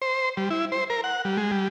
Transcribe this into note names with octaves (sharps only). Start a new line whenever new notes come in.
C5
G3
E4
C5
A#4
F#5
G3
G#3
G3